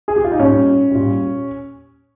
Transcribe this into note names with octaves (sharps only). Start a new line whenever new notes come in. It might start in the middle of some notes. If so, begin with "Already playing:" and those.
G#4
G4
F4
D#4
A#2 G3 C#4
A#2 G3